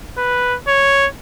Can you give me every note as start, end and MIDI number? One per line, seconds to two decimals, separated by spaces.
0.18 0.56 71
0.68 1.07 73